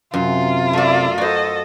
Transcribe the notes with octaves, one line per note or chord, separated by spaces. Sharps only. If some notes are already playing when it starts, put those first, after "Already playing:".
F#2 C3 F4
A3 A#3 D5 E5
F#4 A4 C5 D#5